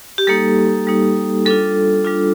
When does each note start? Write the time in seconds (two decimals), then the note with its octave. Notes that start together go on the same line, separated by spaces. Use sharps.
0.18 G4
0.27 G3 A#3 D#4 A4
0.87 G3 A#3 D#4
1.45 G3 D4 F4 A4
2.05 G3 D4 F4